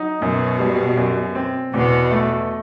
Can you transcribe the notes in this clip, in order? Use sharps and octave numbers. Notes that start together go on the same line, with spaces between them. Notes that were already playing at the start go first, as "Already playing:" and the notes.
Already playing: F#3 D#4
F#2 B2
G3
F#2
C4
E2 B2
A3